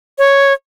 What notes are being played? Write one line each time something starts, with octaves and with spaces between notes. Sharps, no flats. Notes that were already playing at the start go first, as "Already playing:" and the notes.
C#5